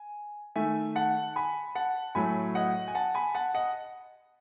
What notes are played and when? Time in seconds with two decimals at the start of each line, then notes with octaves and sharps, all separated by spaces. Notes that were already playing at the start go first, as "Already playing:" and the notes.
Already playing: G#5
0.56 D#3 A3 E5 G#5
0.96 F#5 A5
1.36 G#5 B5
1.75 F#5 A5
2.15 A2 F#3 A3 G#5 B5
2.55 D#5 F#5
2.88 G#5
2.95 F#5 A5
3.15 G#5 B5
3.35 F#5 A5
3.54 D#5 F#5